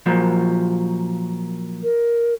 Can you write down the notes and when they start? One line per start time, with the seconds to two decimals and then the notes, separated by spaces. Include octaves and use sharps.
0.06 A#2 F3 F#3
1.83 A#4